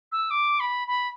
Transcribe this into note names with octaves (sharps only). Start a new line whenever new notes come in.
E6
D6
B5
B5